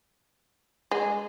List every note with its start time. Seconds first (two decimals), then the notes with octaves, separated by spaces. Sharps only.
0.91 G#3